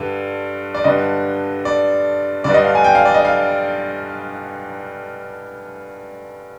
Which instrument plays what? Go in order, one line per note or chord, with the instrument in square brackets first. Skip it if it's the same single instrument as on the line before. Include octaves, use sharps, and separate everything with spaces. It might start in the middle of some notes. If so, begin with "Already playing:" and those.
Already playing: [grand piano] G2 D3
D5
G2 D3 D#5
D5
G2 D3 D5
D#5
F5
G#5
G5
F5
D5
D#5
F5